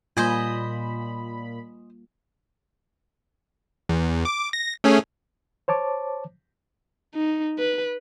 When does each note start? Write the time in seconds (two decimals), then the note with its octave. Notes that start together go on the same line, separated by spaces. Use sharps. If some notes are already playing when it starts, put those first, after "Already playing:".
0.17 A#2 G3 A#3 F4 C5 D#5 G#5 B5
3.89 E2
4.25 D6
4.53 A#6
4.84 A3 C#4 G#4
5.68 C5 C#5 A5 D6
7.15 D#4
7.59 B4